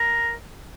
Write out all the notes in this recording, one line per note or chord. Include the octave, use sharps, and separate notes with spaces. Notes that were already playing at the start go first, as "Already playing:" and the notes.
Already playing: A#4